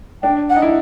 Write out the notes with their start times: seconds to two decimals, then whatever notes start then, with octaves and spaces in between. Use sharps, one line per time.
0.23 D4 G5
0.50 F#5
0.56 D#4
0.62 E4